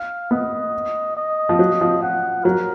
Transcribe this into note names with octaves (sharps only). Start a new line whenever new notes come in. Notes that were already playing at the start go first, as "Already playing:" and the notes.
Already playing: F5
B3 D#5
D#5
F3
F#3
F3
F#5
F#3 A#4